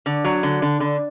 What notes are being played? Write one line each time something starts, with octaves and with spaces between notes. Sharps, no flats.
D3
F#3
D3
D3
D3